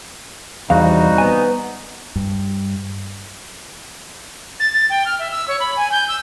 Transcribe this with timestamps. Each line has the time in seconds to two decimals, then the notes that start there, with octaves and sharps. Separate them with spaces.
0.70 E2 C3 G3 D#4 F#4 F5
1.18 B3 G#5
2.16 G2
4.60 A6
4.74 A6
4.90 G5
5.06 F6
5.19 E5
5.32 E6
5.48 C#5
5.60 B5
5.77 G#5
5.92 G6
6.08 E6